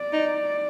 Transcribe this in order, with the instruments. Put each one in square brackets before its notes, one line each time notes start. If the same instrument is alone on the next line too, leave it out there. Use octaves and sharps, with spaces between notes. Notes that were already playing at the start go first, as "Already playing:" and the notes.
Already playing: [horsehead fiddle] D5
[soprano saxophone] D#4